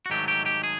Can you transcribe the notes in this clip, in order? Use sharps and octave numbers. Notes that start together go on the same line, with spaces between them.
F#4
G#2 D#3 F#3 A3 G4
G4
G4
G#4